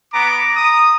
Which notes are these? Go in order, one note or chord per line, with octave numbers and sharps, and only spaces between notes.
B3 A#5 D6
D#6